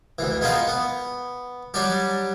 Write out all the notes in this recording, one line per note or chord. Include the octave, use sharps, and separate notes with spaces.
D2 E3
G#3 B3 D#4 F4 G5
B3
F#3 G3 D4 G4